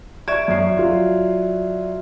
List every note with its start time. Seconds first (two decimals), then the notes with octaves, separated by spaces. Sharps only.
0.28 D5 E5 C#6 G#6
0.48 F#2 C7
0.77 F#3 F4